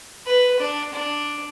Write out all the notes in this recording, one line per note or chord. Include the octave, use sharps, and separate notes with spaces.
B4
D4
D4